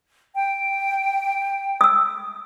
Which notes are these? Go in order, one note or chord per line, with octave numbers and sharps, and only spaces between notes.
G5
D#6 E6